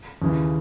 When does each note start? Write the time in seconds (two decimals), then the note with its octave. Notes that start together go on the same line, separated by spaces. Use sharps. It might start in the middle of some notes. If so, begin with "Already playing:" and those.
0.22 D#2 C#3 E3